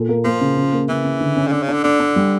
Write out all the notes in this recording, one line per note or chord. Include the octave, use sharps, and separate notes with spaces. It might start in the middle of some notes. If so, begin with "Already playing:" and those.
Already playing: A#2 A4
A#3
F3 A#3
C#3
C#3
A#3
C#3 E3
C#3
D3
C#4
C#3
D3 D4
C#3
D3 D4
D3 D4
D4
G3